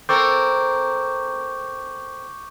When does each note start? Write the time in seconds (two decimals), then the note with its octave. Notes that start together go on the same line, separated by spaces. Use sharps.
0.09 C4 A4 A#4 C#6 D6 G6